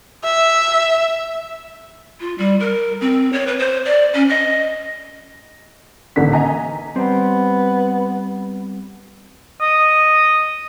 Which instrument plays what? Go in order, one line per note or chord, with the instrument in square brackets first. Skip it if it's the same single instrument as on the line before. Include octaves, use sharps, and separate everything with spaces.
[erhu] E5
[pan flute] F4
G3
A#4
C4
C#5
B4
C5
D5
C#4
D#5
[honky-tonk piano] A1 A#2 D3 D#3 B6
D#5 G#5 A#5
[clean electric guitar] G3 C4 C5 [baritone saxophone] B3
[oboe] D#5